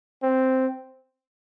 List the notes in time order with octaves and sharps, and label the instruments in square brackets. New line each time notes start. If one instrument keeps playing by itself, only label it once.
[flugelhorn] C4